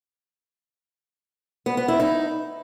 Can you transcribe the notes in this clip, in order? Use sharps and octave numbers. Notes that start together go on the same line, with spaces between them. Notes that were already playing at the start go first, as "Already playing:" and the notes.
B3
B3
E4
D#4